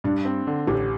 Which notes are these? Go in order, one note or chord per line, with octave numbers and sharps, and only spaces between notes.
G2 D4
C4
D3
A1 G4